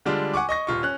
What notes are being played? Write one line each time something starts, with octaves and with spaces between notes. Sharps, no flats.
D3 G3 G#3 D4 F4
F#5 G#5 C#6 D6
D#5 C#6 A#6
D#1 F4 C#6
C#4 F#6